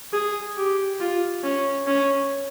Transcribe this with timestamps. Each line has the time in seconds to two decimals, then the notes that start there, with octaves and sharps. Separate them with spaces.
0.13 G#4
0.57 G4
1.00 F4
1.43 C#4
1.87 C#4